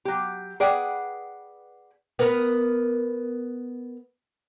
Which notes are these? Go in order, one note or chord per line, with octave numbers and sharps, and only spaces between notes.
F#3 G4
G#4 B4 D5 F#5 G5
B3 A#4 B4